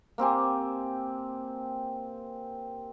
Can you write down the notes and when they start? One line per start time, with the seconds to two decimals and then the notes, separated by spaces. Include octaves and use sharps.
0.18 A#3 C4 G4 G#5